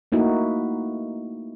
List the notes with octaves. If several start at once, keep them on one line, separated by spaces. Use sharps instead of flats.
A3 A#3 D#4 E4 F#4